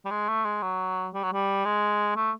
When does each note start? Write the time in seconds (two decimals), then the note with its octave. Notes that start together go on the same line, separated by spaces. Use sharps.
0.05 G3
0.11 G#3
0.28 A3
0.45 G#3
0.62 F#3
1.14 G3
1.23 F#3
1.33 G3
1.65 G#3
2.16 A3